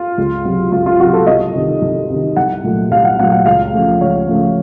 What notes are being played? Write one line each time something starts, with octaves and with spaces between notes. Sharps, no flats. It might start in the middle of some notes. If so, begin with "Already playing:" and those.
Already playing: F4
C#2
C3 F#3
C#2 F4
F4
C3 F#3 F#4
A4
C2 D#5
C3 D#3
C2
C3 D#3
C2 F#5
A#2 F#3 A3
C2 F5
F#5
A#2 F#3 A3 F#5
F#5
C#2 F5
C#3 F3 A3
C#2 C#5
C#3 F3 A3